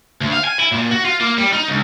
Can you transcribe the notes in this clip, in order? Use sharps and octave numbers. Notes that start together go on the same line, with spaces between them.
D2
F5
G#5
E4
A#2
F#4
F4
A#3
G3
D#4
C#2